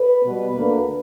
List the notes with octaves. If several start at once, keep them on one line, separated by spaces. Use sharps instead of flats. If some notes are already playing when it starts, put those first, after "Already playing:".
Already playing: B4
B2 G3 B3
D2 D3 A#3